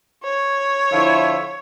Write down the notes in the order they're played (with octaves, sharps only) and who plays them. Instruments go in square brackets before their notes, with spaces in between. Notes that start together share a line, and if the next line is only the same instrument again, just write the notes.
[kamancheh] C#5
[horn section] D3 F3 E4